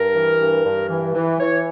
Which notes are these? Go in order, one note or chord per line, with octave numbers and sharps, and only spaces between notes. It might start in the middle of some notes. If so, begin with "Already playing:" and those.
Already playing: G2 A#4
E3
G2
G2
E3
E3
E3 C#5